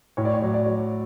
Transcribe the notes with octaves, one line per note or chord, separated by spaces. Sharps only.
A2 C#5
D5
C#5
F#3
D5
F#3